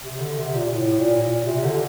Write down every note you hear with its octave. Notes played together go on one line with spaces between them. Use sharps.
C3
D3
C3
A#2
A2
A#2
A#2
C3
D3